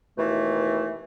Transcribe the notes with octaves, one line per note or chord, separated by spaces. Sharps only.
D#2 B2 E3 A3